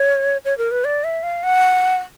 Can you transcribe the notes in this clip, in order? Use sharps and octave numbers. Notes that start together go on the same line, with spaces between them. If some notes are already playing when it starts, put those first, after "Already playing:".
Already playing: C#5
C#5
A#4
B4
D5
E5
F5
F#5